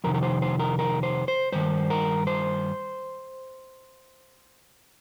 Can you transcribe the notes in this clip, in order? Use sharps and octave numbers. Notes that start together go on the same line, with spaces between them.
F2 C3 D#3 A#4
A#4
C5
C5
A#4
A#4
C5
C5
G2 D#3 C5
A#4
C5